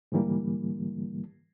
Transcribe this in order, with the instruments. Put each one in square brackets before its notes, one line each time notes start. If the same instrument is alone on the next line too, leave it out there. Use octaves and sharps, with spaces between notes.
[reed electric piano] G#2 D3 E3 G3 A#3